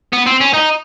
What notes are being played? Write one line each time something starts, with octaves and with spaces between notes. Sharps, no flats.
B3
C4
C#4
D#4